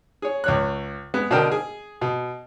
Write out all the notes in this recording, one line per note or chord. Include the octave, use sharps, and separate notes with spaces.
G#4 C#5
C#2 C#5 F#6
G#3 B3
B2 D3 D4 A#4 G5 D#6
G#4
B2